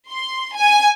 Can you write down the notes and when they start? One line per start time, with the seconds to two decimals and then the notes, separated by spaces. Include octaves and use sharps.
0.11 C6
0.56 G#5